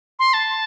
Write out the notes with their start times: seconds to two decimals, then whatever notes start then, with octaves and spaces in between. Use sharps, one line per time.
0.19 C6
0.33 A5